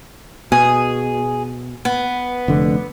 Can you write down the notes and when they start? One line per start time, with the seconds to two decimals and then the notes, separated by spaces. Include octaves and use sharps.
0.52 B2 G#4
1.85 B3
2.48 F1 D3